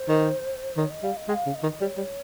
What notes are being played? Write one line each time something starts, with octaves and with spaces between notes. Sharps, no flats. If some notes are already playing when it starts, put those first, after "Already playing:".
Already playing: C5
D#3
D#3 C#5
D#5
G3 F5
D#5
G#3 G5
F5
C#3
D#5
D#3
G3 C#5
G3